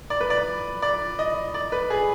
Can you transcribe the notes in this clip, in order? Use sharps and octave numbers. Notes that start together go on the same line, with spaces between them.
D5
B4
D5
D5
D#5
D5
B4
G#4